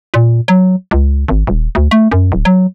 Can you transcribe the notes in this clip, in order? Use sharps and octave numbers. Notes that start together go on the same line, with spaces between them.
A#2
F#3
C#2
G#1
D#1
D2
A3
F#2
D1
F#3